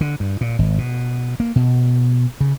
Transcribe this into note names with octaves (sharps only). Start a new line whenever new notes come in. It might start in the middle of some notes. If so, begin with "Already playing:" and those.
D3
G2
A#2
G#1
B2
A#3
B2
C#3